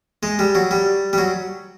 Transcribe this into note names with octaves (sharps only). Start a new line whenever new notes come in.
G#3
G3
F#3
G3
G3
F#3